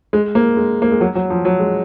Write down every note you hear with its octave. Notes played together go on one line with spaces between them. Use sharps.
G#3
A#3
G#3
A#3
G#3
F#3
F#3
F3
F#3
G#3